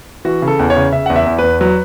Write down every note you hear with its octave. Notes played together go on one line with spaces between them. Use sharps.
E3 F#4
C#3
A4
E2
C#5
C#3
C#3 E5
E2 F#5
E5
E2
E2 B4
F#3 B4